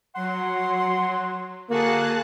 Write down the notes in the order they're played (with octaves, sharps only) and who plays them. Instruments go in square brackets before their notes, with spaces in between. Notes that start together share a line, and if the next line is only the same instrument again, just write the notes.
[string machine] F#3 [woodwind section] F#5 C6
[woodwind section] D3 F#4 [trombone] A#3 [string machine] G#4 A5 F#6